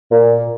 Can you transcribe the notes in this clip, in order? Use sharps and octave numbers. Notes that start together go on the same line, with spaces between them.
A#2